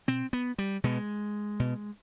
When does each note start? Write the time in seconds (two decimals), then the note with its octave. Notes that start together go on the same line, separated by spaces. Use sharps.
0.08 B2 C4
0.33 B3
0.58 G3
0.84 B2 G#3
1.60 B2